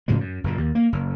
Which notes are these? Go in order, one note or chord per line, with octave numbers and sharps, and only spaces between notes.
A2 C#3 F3 G#3
F#2
F#1 F#2 A#2
D#2
A#3
F#1